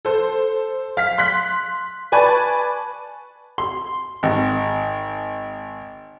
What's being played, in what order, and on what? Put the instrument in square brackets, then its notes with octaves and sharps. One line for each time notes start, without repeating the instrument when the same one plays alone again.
[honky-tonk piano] A4 C5
F5 B6
C6 F#6 B6
B4 D5 G#5 A5 B5 C#6
[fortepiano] C6
G#1